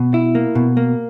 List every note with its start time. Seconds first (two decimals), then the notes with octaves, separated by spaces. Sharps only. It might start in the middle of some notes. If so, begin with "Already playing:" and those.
Already playing: B2
0.14 E4
0.35 A#3
0.55 B2
0.77 A#3